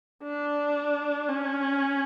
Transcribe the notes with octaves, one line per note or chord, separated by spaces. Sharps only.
D4
C#4